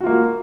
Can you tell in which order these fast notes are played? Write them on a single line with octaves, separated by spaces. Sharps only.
F#4 F4 A#3